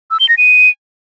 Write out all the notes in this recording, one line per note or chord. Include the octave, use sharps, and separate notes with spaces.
E6
G7
A#6
D#7